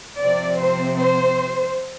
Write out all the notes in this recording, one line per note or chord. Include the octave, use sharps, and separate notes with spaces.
C3 F3 C4 D5
C5
C5